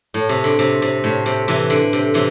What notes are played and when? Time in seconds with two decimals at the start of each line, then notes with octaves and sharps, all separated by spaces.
0.14 A2
0.29 C3
0.44 D3
0.59 C3
0.82 C3
1.04 A2
1.26 C3
1.48 C3 E3
1.70 D3
1.93 C3
2.14 C3 E3